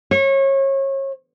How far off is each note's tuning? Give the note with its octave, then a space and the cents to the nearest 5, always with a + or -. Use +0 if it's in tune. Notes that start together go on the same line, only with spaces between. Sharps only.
C#5 -30